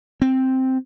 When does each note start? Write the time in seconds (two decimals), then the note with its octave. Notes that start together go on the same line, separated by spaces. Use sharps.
0.22 C4